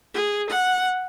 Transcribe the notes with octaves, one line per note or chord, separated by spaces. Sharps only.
G#4
F#5